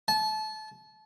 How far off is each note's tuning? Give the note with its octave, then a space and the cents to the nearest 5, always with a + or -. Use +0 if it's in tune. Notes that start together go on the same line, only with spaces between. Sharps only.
A5 -30